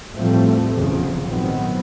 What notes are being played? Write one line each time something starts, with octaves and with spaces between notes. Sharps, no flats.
E2 A2 F3 G3 A3 C4
F1 E2 C#3 F3
A#1 G#2 D#3 F#3 B3 C4